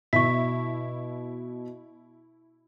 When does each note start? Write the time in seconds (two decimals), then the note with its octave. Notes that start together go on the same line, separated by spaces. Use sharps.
0.13 B2 E4 C#6 B6